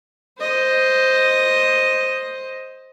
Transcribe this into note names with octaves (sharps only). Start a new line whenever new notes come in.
C5 D#5